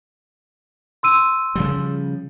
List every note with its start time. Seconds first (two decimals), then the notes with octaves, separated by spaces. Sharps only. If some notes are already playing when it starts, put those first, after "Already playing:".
1.03 C6 E6 D#7
1.55 C#3 F3 G3